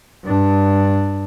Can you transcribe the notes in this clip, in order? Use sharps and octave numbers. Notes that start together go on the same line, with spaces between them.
G2 D4